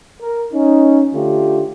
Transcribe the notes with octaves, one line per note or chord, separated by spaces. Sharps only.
A#4
C#4 D#4
D3 A3 F4 G4